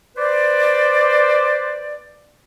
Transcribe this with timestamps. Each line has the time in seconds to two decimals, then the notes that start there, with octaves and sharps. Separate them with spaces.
0.17 B4 C5 D5